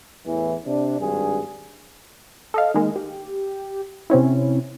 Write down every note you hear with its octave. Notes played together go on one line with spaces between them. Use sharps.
E2 A2 E3
C3 D4
G#1 G2 G#4
A4 D#5 F5
D#3 G#3 A#3
G4
C3 C4 C#4 E4